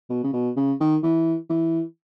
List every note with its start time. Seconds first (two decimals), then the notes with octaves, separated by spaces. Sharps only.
0.10 B2
0.24 C#3
0.33 B2
0.56 C#3
0.80 D#3
1.03 E3
1.49 E3